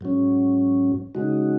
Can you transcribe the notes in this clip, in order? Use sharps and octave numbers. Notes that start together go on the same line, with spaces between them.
G#2 F#3 C#4
C#3 G#3 D#4 F#4